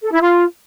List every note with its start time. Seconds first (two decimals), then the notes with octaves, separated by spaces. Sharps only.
0.03 A4
0.12 E4
0.21 F4